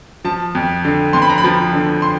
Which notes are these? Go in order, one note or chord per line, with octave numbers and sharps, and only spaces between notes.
F3 A5
F2
D3
F2 C6
B5
A#5
B5
F3
D3
C6